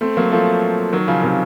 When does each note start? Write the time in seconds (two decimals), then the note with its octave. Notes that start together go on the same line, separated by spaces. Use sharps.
0.01 A3 C4
0.17 F#3 A#3
0.32 F3 A3
0.93 D#3 F#3
1.08 C#3 F3
1.23 C3 D#3